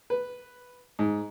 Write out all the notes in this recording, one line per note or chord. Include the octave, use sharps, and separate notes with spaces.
B4
G#2